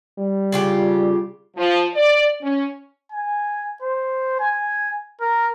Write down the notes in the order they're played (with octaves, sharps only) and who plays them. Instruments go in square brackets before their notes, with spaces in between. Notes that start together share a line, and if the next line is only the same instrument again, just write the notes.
[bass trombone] G3
[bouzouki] C#3 F4 G4
[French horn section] F3
D5
C#4
[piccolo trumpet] G#5
C5
G#5
A#4